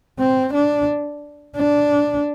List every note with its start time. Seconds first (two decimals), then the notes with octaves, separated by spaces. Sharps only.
0.19 C4
0.54 D4
1.57 D4